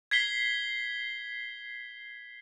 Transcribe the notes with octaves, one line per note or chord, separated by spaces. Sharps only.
G#6 B6 C7 G7